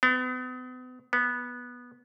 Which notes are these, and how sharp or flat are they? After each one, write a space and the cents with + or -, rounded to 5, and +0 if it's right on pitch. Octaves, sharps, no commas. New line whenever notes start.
B3 +40
B3 -10